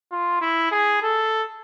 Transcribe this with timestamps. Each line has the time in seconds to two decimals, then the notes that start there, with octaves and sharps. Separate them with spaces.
0.11 F4
0.41 E4
0.71 G#4
1.02 A4